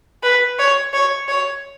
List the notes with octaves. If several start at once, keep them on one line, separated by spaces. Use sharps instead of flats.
B4
C#5
C#5
C#5